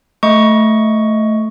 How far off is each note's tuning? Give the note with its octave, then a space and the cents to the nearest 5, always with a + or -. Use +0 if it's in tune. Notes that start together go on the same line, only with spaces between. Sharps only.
A3 +0 D#5 +10 C#6 +5